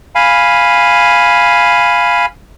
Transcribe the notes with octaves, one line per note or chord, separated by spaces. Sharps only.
F5 G#5 B5